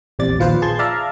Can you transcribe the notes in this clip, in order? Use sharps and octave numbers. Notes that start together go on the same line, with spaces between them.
A#1 E2 C3 D5 A6
A#1 D#2 F3 F4 B4 C5
G#4 A5 C6 G#6
D5 E5 F5 A5 A#5